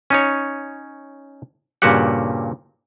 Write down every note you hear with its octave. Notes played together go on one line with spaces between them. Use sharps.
C#4 D#4 C#5
G2 A#2 C#3 F#4 G4 F#5